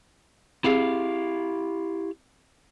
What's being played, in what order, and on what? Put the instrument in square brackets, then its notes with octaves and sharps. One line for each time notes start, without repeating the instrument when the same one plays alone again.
[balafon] C4 G#4 [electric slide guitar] E4 G4 F5